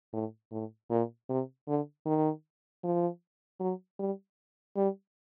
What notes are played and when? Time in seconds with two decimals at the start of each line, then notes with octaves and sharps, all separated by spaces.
0.13 A2
0.52 A2
0.91 A#2
1.29 C3
1.68 D3
2.06 D#3
2.84 F3
3.60 F#3
4.00 G3
4.77 G3